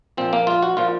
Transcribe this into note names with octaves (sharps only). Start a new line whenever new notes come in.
A#1 A#2 F3 C4
A#3
F4
F#4
A#2 F3 F4